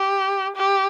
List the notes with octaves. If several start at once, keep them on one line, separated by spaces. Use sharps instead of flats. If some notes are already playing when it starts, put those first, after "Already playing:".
Already playing: G4
G4